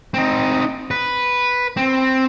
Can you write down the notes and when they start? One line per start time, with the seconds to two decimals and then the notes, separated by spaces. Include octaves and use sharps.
0.14 C4 D#4
0.91 B4
1.77 C4